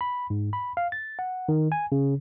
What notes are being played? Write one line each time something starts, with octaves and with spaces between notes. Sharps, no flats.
B5
G#2
B5
F5
A6
F#5
D#3
G#5
C#3